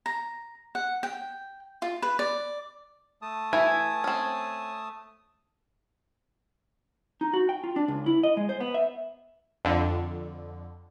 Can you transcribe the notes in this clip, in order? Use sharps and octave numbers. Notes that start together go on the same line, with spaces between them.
A#5
F#5
G5
F4
B4
D5
A3 A5 D#6
E3 E4 E5 G#5
C4 C#4
D#4
F#4
G5
F4
D4
C#2
E4
D#5
G#3
C5
B3
E5
F2 D3